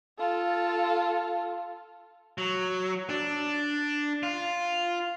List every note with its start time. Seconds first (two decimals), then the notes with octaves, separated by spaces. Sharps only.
0.19 F4 A4
2.38 F#3
3.09 D4
4.23 F4